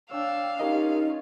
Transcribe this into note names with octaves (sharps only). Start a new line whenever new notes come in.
D4 C#5 F5 G5 E6
C#4 D#4 F4 G4 A#4 D#5